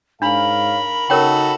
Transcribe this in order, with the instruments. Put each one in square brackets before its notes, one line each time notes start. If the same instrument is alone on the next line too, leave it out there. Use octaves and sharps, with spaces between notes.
[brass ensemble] G#2 C#5 F5 [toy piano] D4 [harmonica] A#4 [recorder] B5
[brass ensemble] C#3 D#4 [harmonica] F#4 A4 [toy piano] A#4 C#5 G5